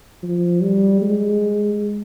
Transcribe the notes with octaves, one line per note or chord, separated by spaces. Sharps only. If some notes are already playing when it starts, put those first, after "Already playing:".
F3
G3
G#3